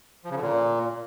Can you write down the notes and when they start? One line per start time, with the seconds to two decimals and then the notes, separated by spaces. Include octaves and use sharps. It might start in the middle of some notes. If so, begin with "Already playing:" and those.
0.24 F3
0.30 C#3
0.36 D3
0.42 A#2